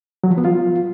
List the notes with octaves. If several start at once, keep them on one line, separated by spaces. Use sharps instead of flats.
F#3
F3
B3
F4